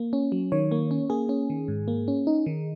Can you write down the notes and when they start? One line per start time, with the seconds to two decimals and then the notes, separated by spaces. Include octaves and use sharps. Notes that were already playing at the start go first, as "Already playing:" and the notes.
Already playing: A#3
0.13 C#4
0.32 F#3
0.52 D#3 C#5
0.71 A#3
0.91 C#4
1.10 A#3 G#4
1.29 C#4
1.50 D#3
1.68 G#2
1.88 A#3
2.08 C#4
2.27 D#4
2.46 D#3